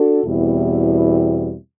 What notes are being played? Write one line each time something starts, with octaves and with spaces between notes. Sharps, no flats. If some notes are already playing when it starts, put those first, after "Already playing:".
Already playing: D4 F#4 A4
E2 B2 G3 C4 E4